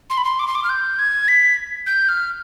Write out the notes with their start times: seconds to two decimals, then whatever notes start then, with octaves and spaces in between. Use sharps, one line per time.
0.10 C6
0.17 B5
0.24 C6
0.39 D6
0.47 C6
0.55 D6
0.64 F6
0.69 G6
0.99 G#6
1.28 B6
1.86 G6
2.09 F6